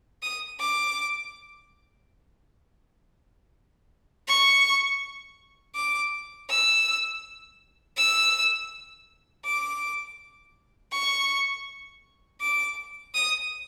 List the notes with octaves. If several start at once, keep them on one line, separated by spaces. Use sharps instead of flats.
D#6
D6
C#6
D6
E6
E6
D6
C#6
D6
D#6